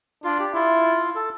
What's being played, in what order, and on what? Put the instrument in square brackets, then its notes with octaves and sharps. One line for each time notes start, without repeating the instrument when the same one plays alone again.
[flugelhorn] D4 [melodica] F4
[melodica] G4
[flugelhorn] E4 [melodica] F4
[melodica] A4